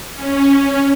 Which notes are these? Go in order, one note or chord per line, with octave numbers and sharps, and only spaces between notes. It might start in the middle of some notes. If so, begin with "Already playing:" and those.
C#4